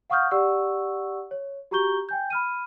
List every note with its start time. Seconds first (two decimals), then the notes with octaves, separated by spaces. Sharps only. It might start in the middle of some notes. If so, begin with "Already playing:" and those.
0.10 F5 F#5 C#6 D#6 F6 G6
0.31 G4 D5 F#5 C#6 E6
1.31 C#5
1.71 F#4 G4 A#5 C#6 G6 G7
2.09 G5 G#5 G6
2.30 B5 F6 D#7